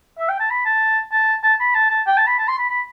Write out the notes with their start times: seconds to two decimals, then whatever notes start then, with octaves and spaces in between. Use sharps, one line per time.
0.18 E5
0.29 G5
0.40 A5
0.50 B5
0.65 A5
1.12 A5
1.43 A5
1.60 B5
1.75 A5
1.90 A5
2.07 G5
2.17 A5
2.27 B5
2.38 A5
2.48 C6
2.59 B5
2.69 B5